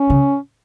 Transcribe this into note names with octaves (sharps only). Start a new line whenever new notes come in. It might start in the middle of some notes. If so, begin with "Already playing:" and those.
Already playing: C#4
C#3